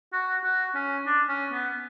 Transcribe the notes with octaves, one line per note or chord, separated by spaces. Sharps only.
F#4
F#4
C#4
D4
C#4
B3